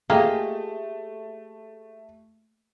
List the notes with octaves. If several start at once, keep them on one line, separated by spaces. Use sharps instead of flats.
A3 A#3 F4 G4 G#4 D#5